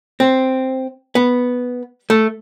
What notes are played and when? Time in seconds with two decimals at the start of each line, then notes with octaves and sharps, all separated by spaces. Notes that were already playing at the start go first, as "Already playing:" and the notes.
0.20 C4
1.15 B3
2.10 A3